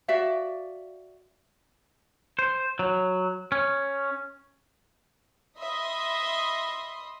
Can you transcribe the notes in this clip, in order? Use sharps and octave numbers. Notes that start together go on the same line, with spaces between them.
F#4 D5 E5 F5
C5
F#3
C#4
D#5 E5 B5 C6 D#6